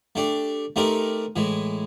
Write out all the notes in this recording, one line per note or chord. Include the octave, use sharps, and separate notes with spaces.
A3 D4 G4
A3 C4 D#4 G4 A#4
A2 E3 G#3